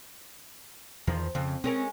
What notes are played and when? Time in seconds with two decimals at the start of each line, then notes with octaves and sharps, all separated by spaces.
1.07 E2 D#3 F3
1.35 F2 C#3
1.64 G#3 C4 C#4 A#4